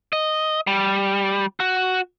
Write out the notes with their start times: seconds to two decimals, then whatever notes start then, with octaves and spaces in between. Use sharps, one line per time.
0.13 D#5
0.67 G3
1.60 F#4